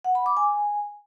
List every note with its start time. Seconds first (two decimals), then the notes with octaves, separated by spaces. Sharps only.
0.04 F#5
0.15 B5
0.26 D6
0.37 G#5